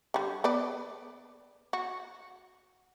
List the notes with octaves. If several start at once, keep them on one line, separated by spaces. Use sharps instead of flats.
D3 G3
B3 B4 D5
F#4